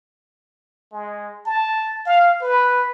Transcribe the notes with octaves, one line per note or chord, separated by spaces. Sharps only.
G#3
A5
F5
B4